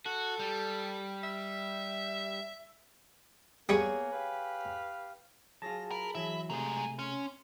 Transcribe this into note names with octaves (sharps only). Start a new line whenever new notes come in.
F#4 A4
G3
E5
G3 A#3 B3 G#4 C#5 D#6
G4 B4 F5
F#3 F4 G#4 A5 A#6
A#4 B5
E3 F#3 E5
C3 F#3 G#3 A3 G#4
G#5
C#4 C6